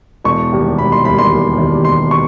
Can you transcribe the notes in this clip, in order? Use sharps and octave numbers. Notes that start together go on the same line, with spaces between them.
E1 C#6
D#2 D#3 G3
E1 B5
C6
D#2 D#3 G3 B5
C6
E1
D#2 D#3 G3
E1 C6
C#6